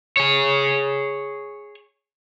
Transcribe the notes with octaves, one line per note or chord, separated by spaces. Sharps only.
G#4 C#5